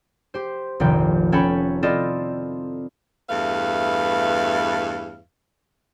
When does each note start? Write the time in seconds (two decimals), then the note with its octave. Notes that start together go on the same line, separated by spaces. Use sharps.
0.34 G4 C5
0.80 F1 A#1 D#3 G5
1.32 B3 C#4 A4 C#5 G5 B5
1.83 C4 E4 F4 A4 D5 D#5
3.29 E2 G2 A3 B4 E5 F5